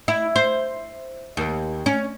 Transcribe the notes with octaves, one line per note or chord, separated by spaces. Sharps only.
E4
C5
D#2
C#4